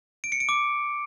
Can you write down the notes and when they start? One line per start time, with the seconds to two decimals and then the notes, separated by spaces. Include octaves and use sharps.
0.24 D7
0.32 C#7
0.40 D7
0.49 D6